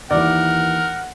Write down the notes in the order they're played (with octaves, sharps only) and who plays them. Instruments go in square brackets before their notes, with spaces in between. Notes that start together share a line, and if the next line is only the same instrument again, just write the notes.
[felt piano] D#2 E3 [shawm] A#4 [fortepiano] D5 [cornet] F#5